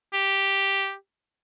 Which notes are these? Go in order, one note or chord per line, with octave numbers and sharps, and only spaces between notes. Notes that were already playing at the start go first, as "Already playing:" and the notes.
G4